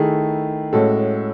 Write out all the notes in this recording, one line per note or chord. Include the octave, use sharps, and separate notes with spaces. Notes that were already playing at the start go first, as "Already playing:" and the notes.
Already playing: D#3 A3 E4 G#4
A2 G#3 C#4 F#4 A4